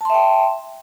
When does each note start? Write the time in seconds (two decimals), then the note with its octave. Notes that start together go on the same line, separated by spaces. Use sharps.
0.01 A5
0.05 C6
0.10 E5
0.14 G5